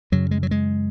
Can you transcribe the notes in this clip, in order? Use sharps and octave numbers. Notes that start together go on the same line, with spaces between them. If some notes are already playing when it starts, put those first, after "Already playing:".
F#2 C#3 F#3
G#3
F#3
G#3